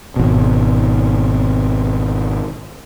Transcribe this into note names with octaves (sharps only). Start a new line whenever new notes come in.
G#1 B2